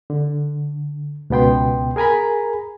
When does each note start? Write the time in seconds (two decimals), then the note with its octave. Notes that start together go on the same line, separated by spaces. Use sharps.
0.10 D3
1.30 C#2 B2 B3 G5 C6
1.96 G#4 A#4 G#5 A#5 B5